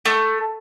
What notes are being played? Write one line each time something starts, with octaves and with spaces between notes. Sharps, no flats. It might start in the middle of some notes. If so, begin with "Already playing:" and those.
A3